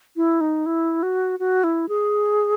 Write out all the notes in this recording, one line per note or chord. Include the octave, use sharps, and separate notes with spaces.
E4
D#4
E4
F#4
F#4
E4
G#4